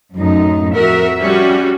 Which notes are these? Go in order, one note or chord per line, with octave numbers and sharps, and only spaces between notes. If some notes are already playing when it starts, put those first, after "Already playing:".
F#2 A2 D#4
F2 F#4 A#4 E5
G3 C#4 F#4